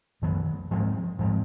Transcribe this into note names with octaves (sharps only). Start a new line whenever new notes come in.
F#2 D#3 F#3 B3
G#2 F3 G#3 C4
G#2 F3 G#3 C4